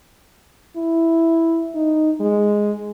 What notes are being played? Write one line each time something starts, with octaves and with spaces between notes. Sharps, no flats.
E4
D#4
G#3